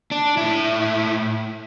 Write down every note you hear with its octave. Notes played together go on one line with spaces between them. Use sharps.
D4
A2 E4